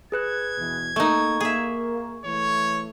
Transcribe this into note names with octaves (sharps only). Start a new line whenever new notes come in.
G#4 B4 F#6 G#6
E2 B2 E3
A3 A#3 D#4 C#6
A#3 G#4 E5
E3 A3 C#5